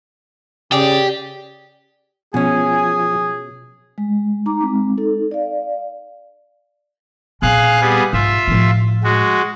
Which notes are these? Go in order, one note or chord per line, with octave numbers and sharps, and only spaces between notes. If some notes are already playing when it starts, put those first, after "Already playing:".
C#3 G4 G#4 D5
B2 F3 C#4 G#4 G#5
G#3
D#4 A#5 D6
G#3 C4
D#4 A4
D5 F5
A#2 C4 G#4 F5 F#6
G3 B3 G#4
G#2 F4 E5
A2 F3
G#3 F#4